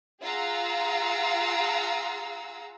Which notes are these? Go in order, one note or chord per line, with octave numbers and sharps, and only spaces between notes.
F4 G#4 F5 F#5 A#5 E6